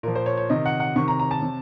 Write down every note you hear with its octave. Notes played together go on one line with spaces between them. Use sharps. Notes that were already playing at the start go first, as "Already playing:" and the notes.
A#2 F3 A#4
C5
C#5
C#5
C3 D#3 D#5
F#5
F#5
C3 D#3 C#6
A#5
A#5
A5
C3